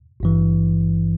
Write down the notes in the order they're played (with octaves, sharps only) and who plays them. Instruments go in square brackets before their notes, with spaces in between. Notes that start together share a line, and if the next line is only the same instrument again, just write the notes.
[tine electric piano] G#1 G2 E3